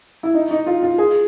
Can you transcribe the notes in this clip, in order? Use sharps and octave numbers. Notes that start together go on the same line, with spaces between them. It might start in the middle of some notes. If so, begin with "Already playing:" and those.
E4
D#4
D#4
F4
F4
G#4